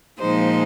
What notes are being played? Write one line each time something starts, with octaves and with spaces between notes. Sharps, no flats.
A#2 F3 G#3 D#4 C5